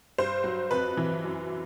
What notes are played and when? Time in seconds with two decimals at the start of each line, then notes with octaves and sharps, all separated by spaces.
0.18 G2 C5
0.44 F#3
0.71 F2 B4
0.97 E3
1.24 F#2
1.50 F#3